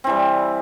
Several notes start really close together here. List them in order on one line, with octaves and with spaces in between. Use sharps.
C4 E3 G3